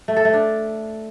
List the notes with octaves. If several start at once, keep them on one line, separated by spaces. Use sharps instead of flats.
A3
A4
A3
D4